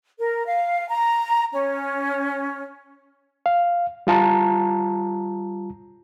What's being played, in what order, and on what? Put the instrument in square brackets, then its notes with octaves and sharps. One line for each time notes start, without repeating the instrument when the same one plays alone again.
[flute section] A#4
F5
A#5
C#4
[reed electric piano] F5
G3 F4 A5 A#5